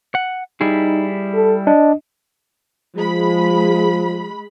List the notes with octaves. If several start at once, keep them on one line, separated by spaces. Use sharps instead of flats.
F#5
G3 D#4 E4 G#4
A4
D4 D#5
F3 G#3 B5